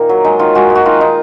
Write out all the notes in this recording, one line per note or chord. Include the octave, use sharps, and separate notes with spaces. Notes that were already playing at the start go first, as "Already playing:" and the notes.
Already playing: A#2 D#3 A#3
F#3
G#3 D#4
D#3 F4
G#3 F#4
G#3
F#4
D#3 F4
G#3 D#4